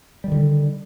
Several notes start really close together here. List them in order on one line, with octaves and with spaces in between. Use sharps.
G3 D#3 D3